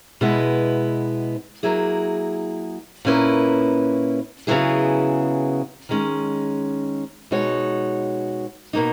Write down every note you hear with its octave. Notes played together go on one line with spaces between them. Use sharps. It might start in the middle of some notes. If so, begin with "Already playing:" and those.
B2 G#3 B3 E4 B4
F#3 A#3 E4 G#4
A#2 A#3 C#4 E4 B4
C#3 F#3 B3 E4 G#4
D#3 G#3 C#4
B2 G#3 D#4 F#4 C#5
B2 A#3 D#4